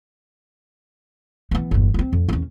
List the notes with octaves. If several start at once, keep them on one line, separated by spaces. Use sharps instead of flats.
E3 B3
G1 E2
B3 C4
F2
E2 C#4